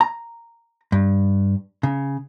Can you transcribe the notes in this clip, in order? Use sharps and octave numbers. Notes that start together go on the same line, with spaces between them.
A#5
G2
C#3